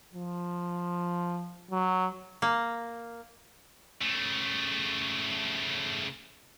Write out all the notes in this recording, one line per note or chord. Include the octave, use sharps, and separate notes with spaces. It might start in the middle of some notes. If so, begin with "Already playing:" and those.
F3
F#3
A#3
C#3 A3